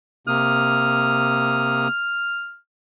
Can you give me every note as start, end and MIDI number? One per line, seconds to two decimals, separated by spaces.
0.27 1.88 48
0.27 1.88 58
0.27 1.88 87
0.27 2.57 89